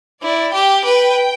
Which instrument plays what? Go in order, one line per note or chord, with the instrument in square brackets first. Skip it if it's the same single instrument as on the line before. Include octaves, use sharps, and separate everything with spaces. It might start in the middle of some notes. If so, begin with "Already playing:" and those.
[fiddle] E4 [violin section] D5
[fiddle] G4 [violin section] G5
[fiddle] B4